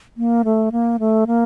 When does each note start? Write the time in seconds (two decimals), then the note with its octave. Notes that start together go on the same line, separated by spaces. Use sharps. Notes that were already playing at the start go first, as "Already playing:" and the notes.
0.17 A#3
0.45 A3
0.72 A#3
1.00 A3
1.27 A#3